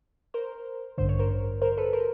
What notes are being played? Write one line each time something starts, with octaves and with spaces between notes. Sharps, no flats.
A#4 C5
A1 G2 D3 C5
C#5
A#4 C5
A#4 C5
A4 B4
A#4 C5